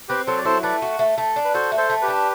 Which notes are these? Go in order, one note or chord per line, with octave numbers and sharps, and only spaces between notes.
C4 G4 B4
F#3 A4 C5
D5
E4 A4 C5
A3 B4 D5
F#4
A3
A3
D4
B4
F#4 A4 C5
A3
A4 C5
A3
G4 B4
D4